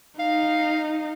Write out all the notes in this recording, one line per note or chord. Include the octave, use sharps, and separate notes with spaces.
D#4 F5